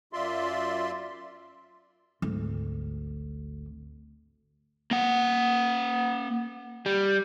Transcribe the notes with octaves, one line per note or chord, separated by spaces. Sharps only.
F#2 F4 D5 E5 C6
G#1 D2
A#3 F#5
G3